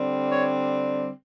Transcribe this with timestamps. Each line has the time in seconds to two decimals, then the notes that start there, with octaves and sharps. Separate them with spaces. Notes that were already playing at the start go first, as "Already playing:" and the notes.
Already playing: D3 G3 C4
0.32 C#5